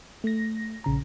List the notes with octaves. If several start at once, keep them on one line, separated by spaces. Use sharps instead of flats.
A3 A#6
A#1 C#3 A#5